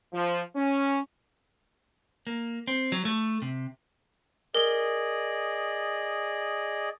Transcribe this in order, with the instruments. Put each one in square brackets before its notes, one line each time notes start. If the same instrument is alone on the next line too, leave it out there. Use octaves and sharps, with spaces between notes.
[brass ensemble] F3
C#4
[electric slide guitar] A#3
C4
F#3
A3
C3
[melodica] G#4 D5 D#5 [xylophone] A#4 G7